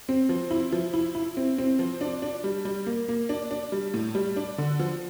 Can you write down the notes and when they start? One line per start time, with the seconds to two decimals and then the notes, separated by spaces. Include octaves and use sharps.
0.09 C4
0.29 F3
0.51 E4
0.72 F3
0.94 E4
1.15 E4
1.37 C4
1.58 C4
1.79 F3
2.01 D4
2.22 D4
2.44 G3
2.65 G3
2.86 A#3
3.08 A#3
3.29 D4
3.51 D4
3.72 G3
3.94 A2
4.15 G3
4.37 D4
4.58 D3
4.79 F3